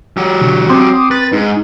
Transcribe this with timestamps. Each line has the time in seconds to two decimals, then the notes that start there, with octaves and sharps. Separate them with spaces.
0.17 F#3 G4
0.41 B2 D3 E3
0.69 C4 C6 D6 D#6
1.11 B4 A6
1.33 G#2 D#4